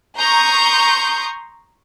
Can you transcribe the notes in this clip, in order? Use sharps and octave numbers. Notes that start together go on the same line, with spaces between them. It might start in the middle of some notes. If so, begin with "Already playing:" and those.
A#5 C6 C#6 D#6 G6